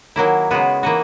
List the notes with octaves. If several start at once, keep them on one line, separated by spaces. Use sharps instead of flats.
D#3 F#3 A#3 E4
C#3 G#3 B3 F#4
E3 A#3 D#4 F#4